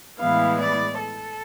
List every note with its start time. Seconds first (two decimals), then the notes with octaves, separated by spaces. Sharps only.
0.19 A2 E3 G#3 B3 E4 F5
0.59 D5
0.99 A4